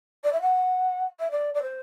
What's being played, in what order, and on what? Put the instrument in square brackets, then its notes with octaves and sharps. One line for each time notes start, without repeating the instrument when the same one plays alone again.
[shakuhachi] D5
E5
F#5
E5
D5
D5
C5